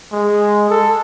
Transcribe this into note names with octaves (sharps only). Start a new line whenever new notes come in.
G#3
A4